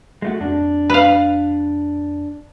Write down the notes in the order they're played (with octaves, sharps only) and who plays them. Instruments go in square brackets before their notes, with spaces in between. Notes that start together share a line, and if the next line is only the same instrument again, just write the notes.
[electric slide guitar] G#3 A3 F#4
[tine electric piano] F2 [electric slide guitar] D4
[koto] B4 F5